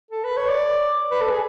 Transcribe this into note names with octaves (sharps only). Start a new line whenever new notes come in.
A4
B4
C#5
D5
B4
A4
G#4